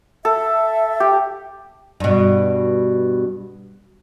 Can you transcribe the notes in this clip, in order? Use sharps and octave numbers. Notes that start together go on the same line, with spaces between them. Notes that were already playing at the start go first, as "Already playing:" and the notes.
A4 E5
G4
G2 B2